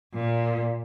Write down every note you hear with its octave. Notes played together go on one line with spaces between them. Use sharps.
A#2